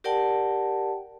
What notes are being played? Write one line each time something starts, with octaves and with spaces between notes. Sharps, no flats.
G4 A#4 D5 F#5 G5 A5